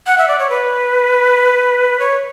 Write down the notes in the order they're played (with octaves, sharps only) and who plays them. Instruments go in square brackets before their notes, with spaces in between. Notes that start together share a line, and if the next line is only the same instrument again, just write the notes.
[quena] F#5
E5
D5
C#5
B4
C#5